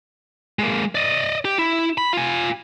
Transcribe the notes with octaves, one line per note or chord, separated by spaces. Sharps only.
G#3 A#3
D5 D#5
G4
E4
B5
F4 G#5